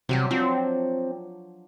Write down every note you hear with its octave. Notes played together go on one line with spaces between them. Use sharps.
C3 F#3 G3 G4
F3 F#3 C4 D4